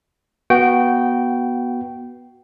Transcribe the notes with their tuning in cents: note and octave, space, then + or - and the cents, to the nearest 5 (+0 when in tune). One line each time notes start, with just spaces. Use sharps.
B3 -20 F#4 +0 G5 -15